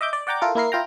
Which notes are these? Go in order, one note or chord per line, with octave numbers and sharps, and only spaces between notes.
D#5 E5 D6 G6
D5
D5 F#5 G5 A#5 D6
E4 F4 A4 A#4
A#3 E4 A#4 C7
E4 F4 G5 A#5